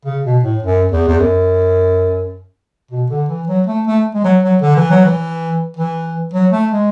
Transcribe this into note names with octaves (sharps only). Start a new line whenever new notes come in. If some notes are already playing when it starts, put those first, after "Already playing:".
C#3
B2
A2
F#2
E2
E2
F#2
B2
D3
E3
F#3
A3
A3
G#3
F#3
F#3
D3
E3
F#3
E3
E3
F#3
A3
G#3